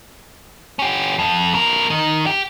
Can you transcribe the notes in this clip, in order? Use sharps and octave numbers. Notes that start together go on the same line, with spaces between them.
C#4 G4
F2
B2 A#4
D#3
G4